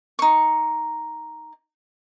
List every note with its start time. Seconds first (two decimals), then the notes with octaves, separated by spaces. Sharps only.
0.19 D#4 C#6